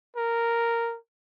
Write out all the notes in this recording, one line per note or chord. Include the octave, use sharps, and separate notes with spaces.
A#4